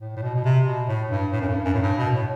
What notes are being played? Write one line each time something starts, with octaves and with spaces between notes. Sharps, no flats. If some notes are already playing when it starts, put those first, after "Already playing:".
A2
A2
B2
B2
C3
B2
A2
G2
A2
F#2
G2
F#2
A2
G2
B2
A2